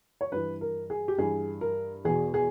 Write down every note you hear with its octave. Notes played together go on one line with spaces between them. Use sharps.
C#5
G2 E3 B4
A#4
G#4
G4
G2 E3 G#4
A#4
E2 B2 G#4
G#4